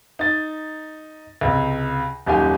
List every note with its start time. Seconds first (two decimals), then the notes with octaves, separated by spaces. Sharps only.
0.19 D#4 A6
1.41 C#2 C3
2.26 D#1 F#2 D#4 G4 F5 G#5